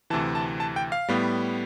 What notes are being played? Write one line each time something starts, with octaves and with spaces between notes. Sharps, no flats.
D2 C3 E3 A5
A5
A5
G5
F5
A2 G3 B3